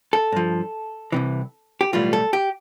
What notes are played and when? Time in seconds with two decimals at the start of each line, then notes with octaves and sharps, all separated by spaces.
0.13 A4
0.32 G2 F3
1.12 C2 C3 E3
1.81 G4
1.93 B1 A2 E3 G3 F4
2.13 A4
2.33 G4